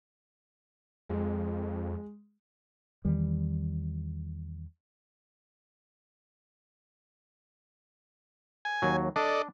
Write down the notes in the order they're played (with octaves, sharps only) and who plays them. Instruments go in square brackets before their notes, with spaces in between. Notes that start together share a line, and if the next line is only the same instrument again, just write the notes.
[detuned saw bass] F2 [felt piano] G#3
[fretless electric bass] E2 D#3 E3 G3
[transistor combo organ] G#5
[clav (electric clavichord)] D#2 F#3
[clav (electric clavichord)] D4 [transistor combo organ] A4 D5 D#5